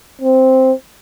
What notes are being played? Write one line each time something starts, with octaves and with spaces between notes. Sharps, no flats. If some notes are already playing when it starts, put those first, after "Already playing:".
C4